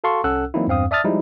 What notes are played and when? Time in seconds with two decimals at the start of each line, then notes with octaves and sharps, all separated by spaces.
0.04 F#4 A4 F5 A5 C6 C#6
0.24 C2 C#4 A4 F#5 E6 F#6
0.54 E3 F#3 A#3 C4 D#4 E4
0.67 E2 G2 C4 F5 D#6
0.91 D5 E5 A5 D#6 F6 A6
1.04 F3 G3 G#3 D#4 E4